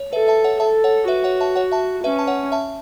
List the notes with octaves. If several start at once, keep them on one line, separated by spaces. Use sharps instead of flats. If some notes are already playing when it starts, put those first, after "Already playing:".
Already playing: C#5
A4 B4 E5
E5 A5
C#5 F#5
A4 E5 A5
C#5 F#5
F#4 B4 E5
C#5 F#5
E5 A5
C#5 F#5
E5 A5
C#4 B4 E5
A5
C#5 F#5
E5 A5